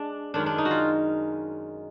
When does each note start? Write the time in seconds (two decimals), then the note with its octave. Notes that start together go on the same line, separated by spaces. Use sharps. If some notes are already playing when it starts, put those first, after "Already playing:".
Already playing: G#3 D4
0.34 F#2 D#3 G#3 C#4 D4
0.46 D4
0.58 D#4
0.65 F#4
0.71 F4